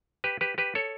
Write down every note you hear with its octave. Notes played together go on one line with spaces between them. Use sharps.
G4 B4
G4 B4
G4 B4
A4 C#5